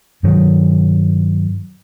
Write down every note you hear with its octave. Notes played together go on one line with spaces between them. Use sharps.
G2 D#3 F#3